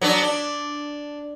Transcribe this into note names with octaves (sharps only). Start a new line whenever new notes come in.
F#3 B3 D4
D4